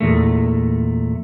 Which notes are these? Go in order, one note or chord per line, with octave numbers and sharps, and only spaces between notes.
E2 A#2 A3